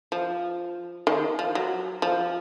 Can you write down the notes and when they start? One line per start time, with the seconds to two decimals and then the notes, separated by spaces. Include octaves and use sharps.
0.12 F3
1.07 D#3
1.39 F3
1.55 F#3
2.02 F3